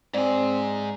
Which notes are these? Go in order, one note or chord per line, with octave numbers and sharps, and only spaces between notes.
G#2 C4 G#4 D5